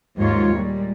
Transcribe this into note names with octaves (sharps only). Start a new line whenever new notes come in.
D#2 G#2 F#3 F4 C#5
A#2 G3 G#3